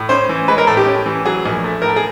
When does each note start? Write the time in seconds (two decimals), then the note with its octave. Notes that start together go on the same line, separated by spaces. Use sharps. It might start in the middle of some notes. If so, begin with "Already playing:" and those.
Already playing: A2
0.09 C#4 C5
0.29 E3
0.48 G#3 B4
0.58 A#4
0.67 A2 A4
0.77 G4
0.86 C#4
1.06 E3
1.25 F#3 G#4
1.45 A#1
1.64 A3
1.82 A2 A#4
1.89 A4
1.96 G#4